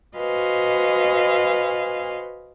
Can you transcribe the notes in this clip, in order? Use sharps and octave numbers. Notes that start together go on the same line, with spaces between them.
F#4 B4 C5 D#5 F5 G#5